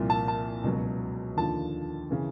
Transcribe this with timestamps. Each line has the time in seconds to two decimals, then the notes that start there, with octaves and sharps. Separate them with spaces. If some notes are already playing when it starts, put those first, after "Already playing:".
Already playing: C2 A#2 F3
0.10 A5
0.28 A5
0.64 C#2 B2 F#3
1.37 D#2 D3 F3 A5
2.11 C#3 E3